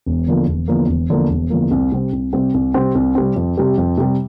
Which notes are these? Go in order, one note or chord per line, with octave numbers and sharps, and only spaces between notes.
E1
E2 D3 F3 A#3
E1
E2 D3 F3 A#3
E1
E2 D3 F3 A#3
E1
E2 D3 F3 A#3
C2
C3 G3 C4
C2
C3 G3 C4
C2
C3 G3 C4
C2
C3 G3 C4
F2
C3 G3
F2
C3 G3